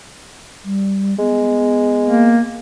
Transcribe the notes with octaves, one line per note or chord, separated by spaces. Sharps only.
G3
G#3 B3
A#3